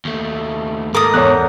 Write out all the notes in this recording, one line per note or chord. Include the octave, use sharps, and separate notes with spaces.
D#2 A3
G#2 A4 A#4 D6 D#6
E2 C#5 F#6